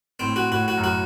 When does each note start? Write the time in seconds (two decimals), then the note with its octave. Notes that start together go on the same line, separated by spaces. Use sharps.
0.20 A2 C4
0.36 F#4
0.52 A2 F#4
0.68 F#4
0.77 F#2
0.84 F#4